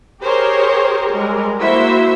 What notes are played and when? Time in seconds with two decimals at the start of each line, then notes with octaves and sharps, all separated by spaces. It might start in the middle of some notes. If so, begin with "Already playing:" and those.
0.21 G4 G#4 A#4 C5 C#5
1.12 G3 G#3 A#4
1.59 F3 A#3 E4 F#4 C5 E5